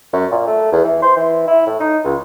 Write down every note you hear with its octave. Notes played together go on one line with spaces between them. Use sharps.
F#2
A#2
A3
E2
E3
C5
E3
E4
A2
D#4
C#2